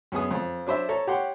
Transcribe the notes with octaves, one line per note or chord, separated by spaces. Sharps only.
F#2 B3 G#4 D#6
F2
F#3 D4 C5 E5
A4 C#5 A#5
G4 C#5 F#5 C6